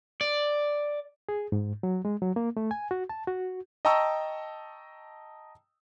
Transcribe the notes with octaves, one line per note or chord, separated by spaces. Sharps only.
D5
G#4
G#2
F#3
G#3
F#3
A#3
A3
G#5
F#4
A5
F#4
D#5 G5 A5 A#5 C#6 E6